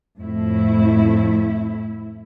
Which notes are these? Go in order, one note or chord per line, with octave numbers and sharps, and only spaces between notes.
F2 A2 E4